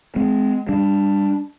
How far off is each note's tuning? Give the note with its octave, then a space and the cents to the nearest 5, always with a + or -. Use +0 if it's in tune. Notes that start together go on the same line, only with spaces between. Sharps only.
G#3 +15 C4 -30
G3 +25 D4 +0